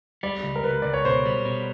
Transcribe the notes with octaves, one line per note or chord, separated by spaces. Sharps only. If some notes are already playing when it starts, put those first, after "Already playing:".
G3 D5
C#2
A#4
C#2 B4
C#2 D5
C#5
B2 C5
G3
B2